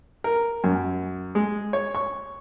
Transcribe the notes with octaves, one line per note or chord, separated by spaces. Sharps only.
A#4
F#2
G#3
C#5
C#6